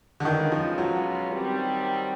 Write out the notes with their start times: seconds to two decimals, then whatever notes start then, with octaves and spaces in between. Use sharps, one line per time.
0.20 D3
0.25 B2 D#3 G#3 C#4 F4
0.52 F3
0.78 F#3
1.31 D#3 G3 C4